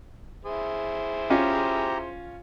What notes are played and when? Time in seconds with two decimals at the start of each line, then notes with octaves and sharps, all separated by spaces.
0.45 E4 G#4 C5
1.30 C#4 F4 G4 A#5